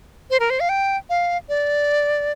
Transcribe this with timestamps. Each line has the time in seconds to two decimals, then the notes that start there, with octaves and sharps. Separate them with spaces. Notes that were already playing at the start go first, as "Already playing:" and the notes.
0.30 C5
0.40 A#4
0.50 C5
0.60 F5
0.69 G5
1.10 F5
1.49 D5